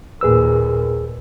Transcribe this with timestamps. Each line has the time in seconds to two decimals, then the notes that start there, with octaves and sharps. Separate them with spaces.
0.21 D#2 A#2 G#4 B4 E6